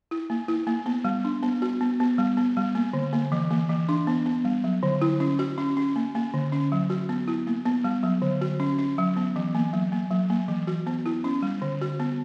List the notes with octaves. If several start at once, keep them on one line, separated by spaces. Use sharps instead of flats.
E4
A#3
E4
A#3
B3
G3
D4
B3
F#4
B3
B3
G3
B3
G3
A#3
D3
A#3
E3
A#3
E3
D4
B3
B3
G3
F#3
D3
E4
C#4
F#4
C#4
C#4
A#3
A#3
D3
C#4
F#3
F#4
B3
E4
A#3
B3
G3
F#3
D3
F#4
C#4
C#4
F#3
B3
E3
A#3
F#3
A#3
F#3
A#3
E3
F#4
B3
E4
C#4
G3
D3
F#4
B3